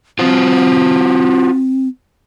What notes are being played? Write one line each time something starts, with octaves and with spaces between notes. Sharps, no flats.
C4 F4 F#4 C5